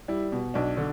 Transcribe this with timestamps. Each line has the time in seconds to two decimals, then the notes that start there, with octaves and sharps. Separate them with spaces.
0.08 G3 E4
0.32 B2
0.54 B1 D4
0.77 D3